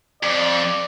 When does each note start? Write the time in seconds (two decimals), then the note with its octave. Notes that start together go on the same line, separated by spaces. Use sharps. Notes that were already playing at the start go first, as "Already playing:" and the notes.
0.23 F2 D5